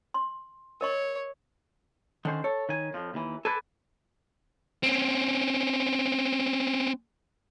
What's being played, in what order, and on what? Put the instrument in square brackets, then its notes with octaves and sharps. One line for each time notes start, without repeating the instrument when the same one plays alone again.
[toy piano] C6
[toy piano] A#4 D#5 C#6 [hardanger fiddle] C#5
[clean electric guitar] D3 C#4 C5 [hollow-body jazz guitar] D#3
[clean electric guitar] A4 [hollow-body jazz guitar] C#5
[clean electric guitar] D#3 G#5
F2 F3
D#2 E3
[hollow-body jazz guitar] A4 [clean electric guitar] B4 D5 G#5
[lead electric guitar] C4 C#4